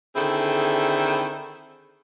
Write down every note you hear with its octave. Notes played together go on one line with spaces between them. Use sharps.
D3 D#3 C4 E4 G#4 A4